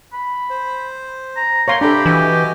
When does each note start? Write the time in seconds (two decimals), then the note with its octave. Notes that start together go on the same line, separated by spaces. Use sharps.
0.13 B5
0.50 C5
1.36 A#5
1.68 A#3 C5 C#5 F5 A#5 C6
1.81 C3 D4 G4 A4 A#5 B5
2.06 E3 F#4 D#5 G#5